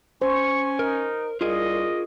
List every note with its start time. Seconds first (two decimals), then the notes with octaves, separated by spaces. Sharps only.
0.22 C#4 C5 C#6
0.79 D#4 A#4
1.41 C2 F4 G#4 A#4 D#5